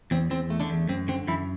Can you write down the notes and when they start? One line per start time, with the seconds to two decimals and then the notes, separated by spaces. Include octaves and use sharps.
0.11 E2 C4
0.30 E2 C4
0.50 A3
0.60 D3 D4
0.70 E2
0.89 F#2 C4
1.08 D3 C4
1.27 F#2 E3 E4